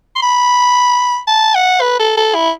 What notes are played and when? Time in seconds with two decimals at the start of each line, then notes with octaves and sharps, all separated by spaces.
0.16 C6
0.22 B5
1.28 A5
1.55 F#5
1.81 B4
2.00 A4
2.17 A4
2.35 E4